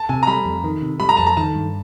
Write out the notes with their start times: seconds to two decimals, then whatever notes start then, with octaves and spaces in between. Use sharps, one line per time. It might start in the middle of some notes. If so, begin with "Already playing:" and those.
Already playing: A5
0.09 C3 G#5
0.23 A#5
0.27 G3 B5
0.45 F2
0.64 D#3
0.82 C3
1.00 G3 B5
1.09 A#5
1.17 F2 A5
1.27 A#5
1.37 D#3 A5
1.55 G2